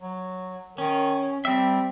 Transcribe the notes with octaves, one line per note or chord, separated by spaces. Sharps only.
F#3
D#3 C#4
G3 C4 E5